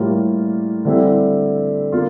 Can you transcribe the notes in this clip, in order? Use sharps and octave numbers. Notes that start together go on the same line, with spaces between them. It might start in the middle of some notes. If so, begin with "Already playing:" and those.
Already playing: A2 G3 A#3 F4
D3 G3 C4 E4
A#3 F4